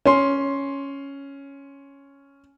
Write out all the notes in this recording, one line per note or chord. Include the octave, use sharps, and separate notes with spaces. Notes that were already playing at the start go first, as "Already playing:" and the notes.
C#4 C6